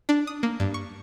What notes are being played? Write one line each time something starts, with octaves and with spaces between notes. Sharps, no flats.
D4
D#6
A#3
G2
C#6